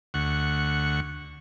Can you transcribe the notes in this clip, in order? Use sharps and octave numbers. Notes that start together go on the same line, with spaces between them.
D2 F#5 C#6